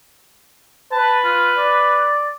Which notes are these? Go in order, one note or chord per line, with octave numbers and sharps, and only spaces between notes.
B4 A5
F4
D5